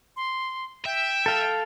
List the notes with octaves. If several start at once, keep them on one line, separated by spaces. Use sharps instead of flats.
C6
E5 G5
A4 F5